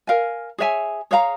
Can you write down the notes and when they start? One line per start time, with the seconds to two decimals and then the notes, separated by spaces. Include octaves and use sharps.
0.07 A#4 F5 G#5
0.58 G#4 C#5 E5 G#5
1.11 G#4 C#5 F5 A#5